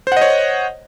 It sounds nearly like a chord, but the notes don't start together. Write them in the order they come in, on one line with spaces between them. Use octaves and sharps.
C5 F#5 D#5 C#5